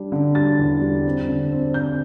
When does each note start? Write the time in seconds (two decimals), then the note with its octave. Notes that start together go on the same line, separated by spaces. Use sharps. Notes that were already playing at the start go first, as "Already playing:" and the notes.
Already playing: G3 D4
0.12 D3
0.35 G3 A6
0.59 E2
0.81 G3
1.06 C4
1.28 D3
1.51 C4
1.74 C4 G6